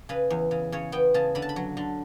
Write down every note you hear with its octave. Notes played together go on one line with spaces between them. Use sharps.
C#3 B4
E2
C#3
C#3 C#5
B3 G5
C#3 A5
D3 B5
A5
B5
F#3
D3